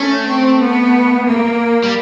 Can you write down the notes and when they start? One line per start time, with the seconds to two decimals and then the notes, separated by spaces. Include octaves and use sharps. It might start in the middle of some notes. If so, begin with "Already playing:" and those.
Already playing: A3 C#4
0.26 C4
0.59 B3
1.26 A#3
1.83 G3